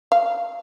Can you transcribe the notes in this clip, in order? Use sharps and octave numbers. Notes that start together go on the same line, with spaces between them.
F5